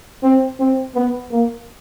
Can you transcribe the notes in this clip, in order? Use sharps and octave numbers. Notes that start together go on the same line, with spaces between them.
C4
C4
B3
A#3